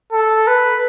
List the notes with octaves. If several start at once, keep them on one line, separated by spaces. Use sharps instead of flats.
A4
B4